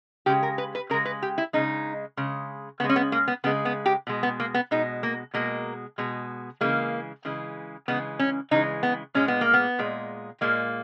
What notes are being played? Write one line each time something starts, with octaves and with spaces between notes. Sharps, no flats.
C#3 G#3 G4
A#4
B4
B4
C#3 G#3 A#4
B4
G4
E4
C#3 G#3 D#4
C#3 G#3
C#3 G#3 B3
C#4
B3
A#3
B3
C#3 G#3 B3
B3
G4
B2 G#3
B3
A#3
B3
B2 G#3 D#4
A#3
B2 G#3 A#3
B2 G#3
C#3 E3 G#3 A#3
C#3 E3 G#3
C#3 E3 G#3 B3
C#4
C#3 E3 G#3 D#4
B3
A#2 G#3 C#4
B3
A#3
B3
A#2 G#3
A#2 G#3 A#3